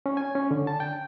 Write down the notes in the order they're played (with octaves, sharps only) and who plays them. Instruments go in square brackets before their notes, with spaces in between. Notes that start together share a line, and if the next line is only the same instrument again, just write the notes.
[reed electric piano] C#4
G#5
C#4
D3
A5
G5